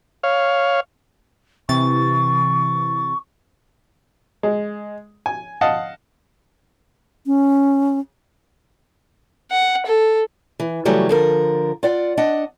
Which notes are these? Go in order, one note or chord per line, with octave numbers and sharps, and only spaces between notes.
C#5 F5
C3 E3 C#6 A6
G#3
G#5
D#5 F5 F#5 A5
C#4
F#5
A4
E3
C#3 E3 F#3 G3 A3
D3 F3 A#4
F4 D5 F#5
D4 D#5 F#5